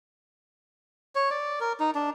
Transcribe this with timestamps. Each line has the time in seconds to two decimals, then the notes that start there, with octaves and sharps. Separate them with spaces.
1.15 C#5
1.31 D5
1.60 A#4
1.80 D#4
1.95 D4